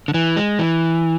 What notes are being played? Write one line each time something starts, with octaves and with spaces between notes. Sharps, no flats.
D3
E3
G#3
E3